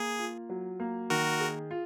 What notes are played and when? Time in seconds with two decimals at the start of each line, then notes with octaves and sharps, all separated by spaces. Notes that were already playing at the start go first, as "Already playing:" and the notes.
Already playing: A#3 G#4
0.19 F4
0.50 F#3
0.80 A#3
1.10 D#3 F#4 A#4
1.40 G#4
1.71 F4